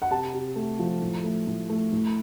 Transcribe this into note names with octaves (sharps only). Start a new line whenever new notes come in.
F#5
C3 A5
C3
A3
F3
A2
A3
A2
A3
A2